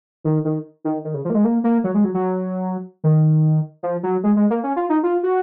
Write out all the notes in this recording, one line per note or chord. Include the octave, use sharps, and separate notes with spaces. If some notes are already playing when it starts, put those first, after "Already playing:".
D#3
D#3
D#3
D#3
C#3
F3
A#3
G#3
A#3
A#3
F#3
G#3
F#3
F#3
D#3
F3
F#3
G#3
G#3
A#3
C#4
F4
D#4
F4
F#4